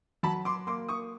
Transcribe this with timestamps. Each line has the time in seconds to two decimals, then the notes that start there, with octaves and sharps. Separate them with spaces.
0.23 F#3 A5 B5
0.45 C6 D6
0.67 A#3 C6 D6
0.89 C#6 D#6